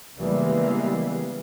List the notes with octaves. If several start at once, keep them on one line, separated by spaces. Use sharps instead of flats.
C#3 E3 G3 G#3 A#3 B3